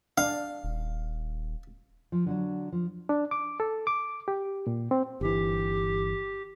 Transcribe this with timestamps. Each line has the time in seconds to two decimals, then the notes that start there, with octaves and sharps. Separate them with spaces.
0.18 D4 F5
0.63 D#1
2.12 F3
2.26 D3 F#3 D4
2.72 F3
3.09 D4
3.31 D6
3.60 A4
3.87 D6
4.28 G4
4.67 A#2
4.91 C4
5.21 G1 E3 G4